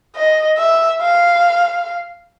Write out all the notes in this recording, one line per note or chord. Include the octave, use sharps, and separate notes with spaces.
D#5
E5
F5